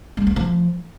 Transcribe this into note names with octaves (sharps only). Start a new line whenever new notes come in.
G#3
A3
F3